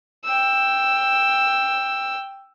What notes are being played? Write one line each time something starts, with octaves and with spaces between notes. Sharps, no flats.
G5 E6